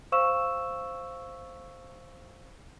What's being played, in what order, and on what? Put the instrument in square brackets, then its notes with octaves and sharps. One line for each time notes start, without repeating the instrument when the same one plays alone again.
[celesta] C5 F5 C#6 E6 E7